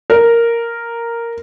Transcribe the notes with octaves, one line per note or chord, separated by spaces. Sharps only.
A#4